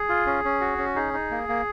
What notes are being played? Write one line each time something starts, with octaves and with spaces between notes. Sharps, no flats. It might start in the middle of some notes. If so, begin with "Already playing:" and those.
Already playing: G#4
F4
C#4
C#4
F#4
C#4
D#4 G#4
D#4
A#3
A#3